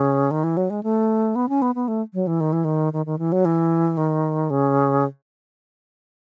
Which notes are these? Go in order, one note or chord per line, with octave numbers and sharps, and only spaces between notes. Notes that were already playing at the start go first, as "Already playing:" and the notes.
Already playing: C#3
D#3
E3
F#3
G#3
A3
B3
C#4
B3
B3
A3
F#3
E3
D#3
E3
D#3
D#3
D#3
E3
F#3
E3
D#3
C#3